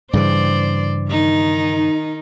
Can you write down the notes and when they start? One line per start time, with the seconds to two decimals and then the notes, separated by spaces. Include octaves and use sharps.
0.13 G2 C#3 E3 C5 D5
1.09 D#3 D#4